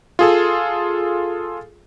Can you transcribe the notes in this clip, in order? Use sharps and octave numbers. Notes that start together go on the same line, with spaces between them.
F4 G#4 A4